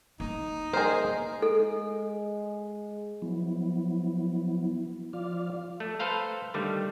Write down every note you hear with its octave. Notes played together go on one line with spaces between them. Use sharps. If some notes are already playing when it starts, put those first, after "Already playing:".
A#3 D#4
G#4 A#4 C5 D#5
G#3 A4
F3 F#3 B3 E4
F3 F4 D5 F5 D6 F6
A3
A4 B4 C5 F5 A#5
D3 D#3 G3 A3